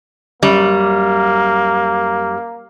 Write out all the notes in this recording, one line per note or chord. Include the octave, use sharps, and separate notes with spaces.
F#2 G3 A#3